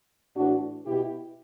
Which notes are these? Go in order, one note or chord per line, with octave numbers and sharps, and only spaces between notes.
A2 E3 D4 F#4
B2 E4 G4